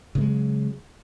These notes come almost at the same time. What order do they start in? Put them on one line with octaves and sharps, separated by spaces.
C#3 A3 G#3 F#3